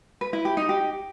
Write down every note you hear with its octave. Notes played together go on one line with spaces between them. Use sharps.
B4
E4
G4
D#4
G4